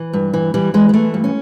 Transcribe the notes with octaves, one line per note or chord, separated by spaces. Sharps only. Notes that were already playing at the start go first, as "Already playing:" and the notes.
Already playing: E3
G2
E3
E3 G3
E3 G#3
G#3
E3 A3
G2
C#4